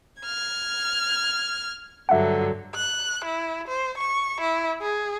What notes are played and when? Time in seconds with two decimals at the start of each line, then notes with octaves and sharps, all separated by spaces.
0.21 F6 G#6
2.09 G2 D3 F#3 E5 F#5
2.75 F#6
3.25 E4
3.68 C5
3.98 C#6
4.41 E4
4.82 G#4